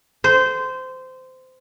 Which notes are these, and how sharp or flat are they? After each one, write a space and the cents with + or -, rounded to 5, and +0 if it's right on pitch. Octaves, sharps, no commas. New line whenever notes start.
C5 -20